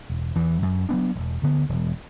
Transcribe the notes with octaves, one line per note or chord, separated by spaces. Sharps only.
E1
E2 E3
F#2
F#3 B3 D4
E1
D2 D3 B3
E1